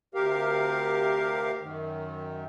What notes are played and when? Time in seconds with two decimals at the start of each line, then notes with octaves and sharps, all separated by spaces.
0.15 D2 C3 G4 A#4 F5
1.61 F#2 D#3